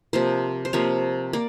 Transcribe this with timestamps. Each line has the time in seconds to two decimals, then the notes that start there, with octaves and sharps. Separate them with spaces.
0.13 C3 F3 A#3 C5
0.65 C5
0.73 C3 F3 A#3 C#5
1.33 A#3 D5